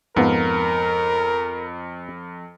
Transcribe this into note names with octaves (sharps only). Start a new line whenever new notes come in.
F2 G#2 B3 F4 A#4